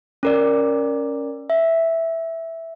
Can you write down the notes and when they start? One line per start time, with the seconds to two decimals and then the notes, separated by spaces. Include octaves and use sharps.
0.23 C#4 A#4 D5
1.50 E5